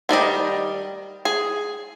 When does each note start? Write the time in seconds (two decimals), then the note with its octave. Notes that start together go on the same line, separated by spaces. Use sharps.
0.09 D#3 G3 D5 D#5
1.25 G#4